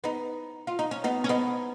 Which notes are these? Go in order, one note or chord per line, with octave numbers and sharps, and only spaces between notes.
B3 D#4
F4
D#4
C#4
B3 D#4
C#4
B3 D#4